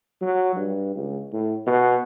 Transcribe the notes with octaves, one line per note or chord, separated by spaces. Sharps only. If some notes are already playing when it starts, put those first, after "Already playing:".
F#3
G2
C#2
A2
B2